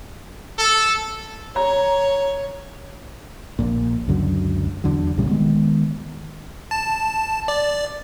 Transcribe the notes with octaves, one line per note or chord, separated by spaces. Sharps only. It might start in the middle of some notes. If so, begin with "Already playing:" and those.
A4
C#5 A#5
A#1 A#2
C#2 F#2 D3 F#3
E2 D3 F#3
C2 A#2 C#3 G3
D#3 G#3 B3
A5
D5